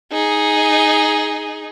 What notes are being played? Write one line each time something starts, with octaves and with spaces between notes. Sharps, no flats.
D#4 G#4